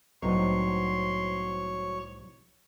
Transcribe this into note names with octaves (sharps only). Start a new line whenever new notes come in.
C2 A2 F#3 B3 C4 D#4 C#5 C6